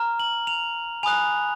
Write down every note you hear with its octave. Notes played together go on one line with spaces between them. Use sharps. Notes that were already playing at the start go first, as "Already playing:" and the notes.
Already playing: A#5 F6
F#7
F7
G#5 B5 D#6 F#6 F7